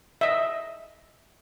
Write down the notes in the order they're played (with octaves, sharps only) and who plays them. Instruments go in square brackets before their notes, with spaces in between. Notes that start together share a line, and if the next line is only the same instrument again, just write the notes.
[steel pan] D#5 E5